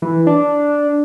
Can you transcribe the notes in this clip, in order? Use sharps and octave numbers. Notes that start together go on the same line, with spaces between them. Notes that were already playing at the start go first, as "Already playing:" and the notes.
E3
D4